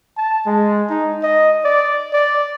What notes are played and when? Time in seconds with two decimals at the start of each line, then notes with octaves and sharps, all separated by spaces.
0.17 A5
0.46 G#3
0.90 D#4
1.23 D#5
1.65 D5
2.13 D5